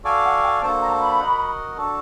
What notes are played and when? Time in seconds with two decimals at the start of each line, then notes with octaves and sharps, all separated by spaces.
0.04 F#4 A4 D5 F5 G#5
0.25 F#5
0.43 G5
0.62 A#3 D4 F#4 A4 C5 A5
0.82 A#5
1.00 B5
1.20 F#4 A#4 D#5 F#5
1.77 D4 F#4 A4